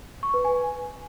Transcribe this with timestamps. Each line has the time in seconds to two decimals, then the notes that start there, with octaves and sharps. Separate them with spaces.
0.23 C#6
0.34 B4
0.45 G#5